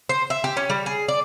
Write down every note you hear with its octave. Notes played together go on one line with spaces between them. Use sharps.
C5
E5
G4
C#4
G3
G#4
D5